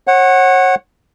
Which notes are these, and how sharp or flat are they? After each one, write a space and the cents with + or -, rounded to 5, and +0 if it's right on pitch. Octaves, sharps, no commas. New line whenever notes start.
C#5 -35 F#5 +0